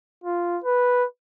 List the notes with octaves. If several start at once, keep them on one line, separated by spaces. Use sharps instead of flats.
F4
B4